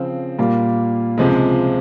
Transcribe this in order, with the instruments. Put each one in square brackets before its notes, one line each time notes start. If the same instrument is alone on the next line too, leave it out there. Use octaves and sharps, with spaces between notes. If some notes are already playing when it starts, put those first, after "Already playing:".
Already playing: [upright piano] C#3 F3 C4
A#2 G3 A#3 F4
C#2 C3 F3 G#3